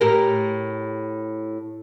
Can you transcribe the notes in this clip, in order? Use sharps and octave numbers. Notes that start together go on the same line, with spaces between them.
A2 G4 A#4